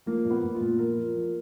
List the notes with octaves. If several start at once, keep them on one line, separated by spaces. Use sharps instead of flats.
F3 A#3
A#2
B3
A#2
F4
A#2
F3 A#4
F3
F3